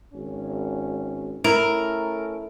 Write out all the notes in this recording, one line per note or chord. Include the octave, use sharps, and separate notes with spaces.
G#1 C#4
A3 C#4 E4 A4 A#4